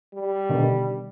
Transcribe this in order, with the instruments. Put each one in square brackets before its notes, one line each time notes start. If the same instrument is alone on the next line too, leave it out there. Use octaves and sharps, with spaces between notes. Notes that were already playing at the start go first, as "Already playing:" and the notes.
[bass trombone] G3
[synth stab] B2 D3 D#3